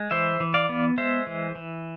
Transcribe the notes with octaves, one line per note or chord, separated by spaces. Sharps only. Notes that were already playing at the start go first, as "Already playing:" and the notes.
Already playing: G#3
E3 C5 E5
E3
D5 F5
B3
G#3 C5 E5
E3
E3